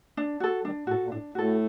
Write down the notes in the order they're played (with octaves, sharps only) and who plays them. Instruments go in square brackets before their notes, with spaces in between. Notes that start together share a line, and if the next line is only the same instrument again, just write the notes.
[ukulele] D4
F#4 A4
[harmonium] D#3 G3 [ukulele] D4
[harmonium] A2 [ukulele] F#4
[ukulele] A4
[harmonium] A#2
[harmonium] A2 [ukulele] D4
[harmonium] A2 [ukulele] F#4 A4